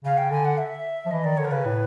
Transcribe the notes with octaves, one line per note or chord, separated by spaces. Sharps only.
C#3 F5
G5
D3 G#5
F#5
E5
F3
E3 D#5
D#3 D5
D3 C#5
A#4
C#3 B4
A2